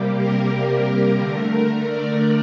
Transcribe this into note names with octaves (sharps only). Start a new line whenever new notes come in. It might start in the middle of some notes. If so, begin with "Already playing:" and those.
Already playing: C3 G3 A#3 G4
A#4
D3 A3
D5